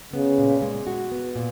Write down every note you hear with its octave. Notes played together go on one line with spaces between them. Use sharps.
C#3 B3
A#2
G#3
F#4
B3
A#2